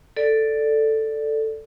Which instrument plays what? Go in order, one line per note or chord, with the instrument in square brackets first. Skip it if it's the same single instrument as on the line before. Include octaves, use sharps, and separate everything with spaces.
[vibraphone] A4 D5